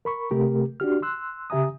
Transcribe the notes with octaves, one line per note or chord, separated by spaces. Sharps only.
A#4 B5 C#6
C3 A3 G4 A#4
D4 F#4 G4 F6
C6 E6 F#6
C#3 G4 E5 G#5 A#5 D#6